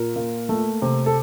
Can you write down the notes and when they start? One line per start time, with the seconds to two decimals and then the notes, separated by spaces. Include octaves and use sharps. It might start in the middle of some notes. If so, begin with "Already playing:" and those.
Already playing: A#2 A#4
0.16 A#3
0.49 A3
0.82 C3
1.06 A4